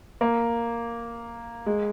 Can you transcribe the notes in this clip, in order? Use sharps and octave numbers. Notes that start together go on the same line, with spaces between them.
A#3
G#3